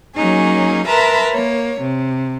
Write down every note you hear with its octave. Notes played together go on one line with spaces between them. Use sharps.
F#3 A#3 C#4 D#4 G#4
A#4 B4 E5 A5 A#5 C6
A#3 C#5
C3